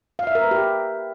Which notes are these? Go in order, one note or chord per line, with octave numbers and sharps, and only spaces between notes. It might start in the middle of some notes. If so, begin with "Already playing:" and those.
F5
E5
A#4
B4
G4